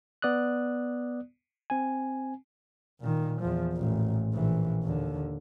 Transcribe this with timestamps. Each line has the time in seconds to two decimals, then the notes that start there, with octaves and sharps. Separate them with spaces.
0.22 B3 D5 D#6 F#6
1.70 C4 G#5
3.01 A#2 D#3
3.41 E2 F3
3.73 A1 A#2
4.33 A#1 E3
4.83 D#2 D3